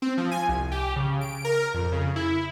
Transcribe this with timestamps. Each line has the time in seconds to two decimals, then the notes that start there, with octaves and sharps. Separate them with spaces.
0.02 C4
0.18 F3
0.31 G#5
0.49 C2
0.72 G4
0.96 C#3
1.21 D7
1.45 A#4
1.74 F2
1.92 C#3
2.16 E4